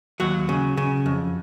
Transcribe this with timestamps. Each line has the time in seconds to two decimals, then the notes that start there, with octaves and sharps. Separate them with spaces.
0.20 D#2 F#3 F#4
0.49 C#3
0.77 C#3
1.06 F2